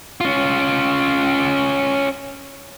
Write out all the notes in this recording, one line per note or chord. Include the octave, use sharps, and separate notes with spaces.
C#4 F4